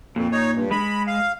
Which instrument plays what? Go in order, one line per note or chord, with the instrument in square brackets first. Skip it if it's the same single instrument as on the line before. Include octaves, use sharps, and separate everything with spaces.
[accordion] F2 [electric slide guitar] A#2
[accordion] D#4 C#5
G2
[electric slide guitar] G#3 [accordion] B5
[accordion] F5